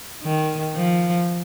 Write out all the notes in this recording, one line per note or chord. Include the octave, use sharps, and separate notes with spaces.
D#3
F3